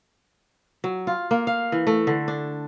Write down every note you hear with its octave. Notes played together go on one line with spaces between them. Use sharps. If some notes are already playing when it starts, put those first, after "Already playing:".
F#3
F4
A#3
F5
E3
A3
D3
D4